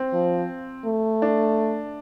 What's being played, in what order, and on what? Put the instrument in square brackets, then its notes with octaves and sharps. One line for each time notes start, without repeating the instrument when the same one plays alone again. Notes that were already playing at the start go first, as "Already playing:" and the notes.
Already playing: [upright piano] C4
[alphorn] F3
A3
[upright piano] D4